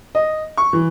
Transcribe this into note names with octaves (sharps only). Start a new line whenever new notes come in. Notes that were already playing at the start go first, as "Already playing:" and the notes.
D#5
C#6
E3